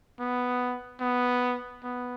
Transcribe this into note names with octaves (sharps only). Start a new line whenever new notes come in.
B3
B3
B3